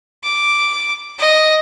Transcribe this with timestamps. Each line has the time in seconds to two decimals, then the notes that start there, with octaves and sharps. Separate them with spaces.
0.23 D6
1.19 D#5